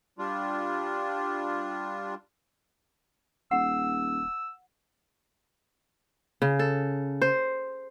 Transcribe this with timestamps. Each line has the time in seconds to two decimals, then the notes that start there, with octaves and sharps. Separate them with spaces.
0.19 G3 D4 F4
3.51 D#1 F#5 E6
6.42 C#3
6.59 A4
7.22 C5